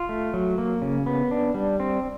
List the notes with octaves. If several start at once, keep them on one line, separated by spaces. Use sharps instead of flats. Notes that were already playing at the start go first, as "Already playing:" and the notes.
Already playing: F4
A3
F#3
A#3
C#3
B3
D4
G3
C4